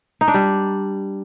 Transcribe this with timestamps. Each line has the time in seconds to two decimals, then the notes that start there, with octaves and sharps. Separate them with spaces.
0.21 D#4
0.28 D4
0.34 G3